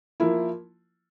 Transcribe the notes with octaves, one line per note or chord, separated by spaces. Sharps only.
F3 A#3 E4